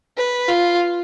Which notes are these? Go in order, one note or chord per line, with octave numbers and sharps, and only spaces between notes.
B4
F4